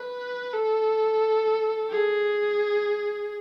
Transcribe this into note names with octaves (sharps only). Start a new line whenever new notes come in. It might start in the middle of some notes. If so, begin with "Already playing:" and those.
Already playing: B4
A4
G#4